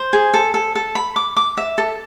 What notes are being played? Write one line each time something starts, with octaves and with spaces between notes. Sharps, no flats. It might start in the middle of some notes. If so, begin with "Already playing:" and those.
Already playing: C5
G#4
A4
A4
A4
B5
D6
D6
E5
A4